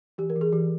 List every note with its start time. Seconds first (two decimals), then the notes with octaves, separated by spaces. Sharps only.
0.18 E3 G4
0.30 A#4
0.36 E3
0.41 G#4
0.52 E3 G4